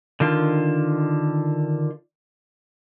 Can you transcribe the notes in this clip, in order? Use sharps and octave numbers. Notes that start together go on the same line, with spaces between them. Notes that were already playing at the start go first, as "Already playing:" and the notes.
D3 D#3 F4